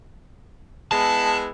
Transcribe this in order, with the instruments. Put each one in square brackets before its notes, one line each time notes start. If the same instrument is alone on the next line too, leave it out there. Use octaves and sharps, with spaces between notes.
[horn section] G#3 B3 E4 [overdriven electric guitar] A5